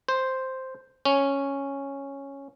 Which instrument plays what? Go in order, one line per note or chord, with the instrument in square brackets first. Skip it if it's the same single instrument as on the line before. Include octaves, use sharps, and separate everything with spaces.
[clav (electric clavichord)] C5
C#4